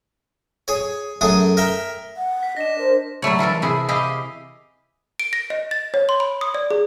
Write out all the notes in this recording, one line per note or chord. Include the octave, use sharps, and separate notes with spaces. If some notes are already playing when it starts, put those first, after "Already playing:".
G#4 C#5
F#2 A3 G#4 D#6
A#4 E5 G5
F#5
B6
D4 D#5 A#6 E7
A#4 C5
F#3 G3 A3 C#5
E3 F4 A4 A#4
C3 E4 G#4
E4 G4 G#4 D#5 F5
D7
A#6
D#5
A6
C#5
C6
B5
D#6
D5
G#4